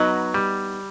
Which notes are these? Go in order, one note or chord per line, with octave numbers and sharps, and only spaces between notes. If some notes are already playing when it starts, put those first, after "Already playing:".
Already playing: F#3 B3 D#4 F#4 B4 D#5
G3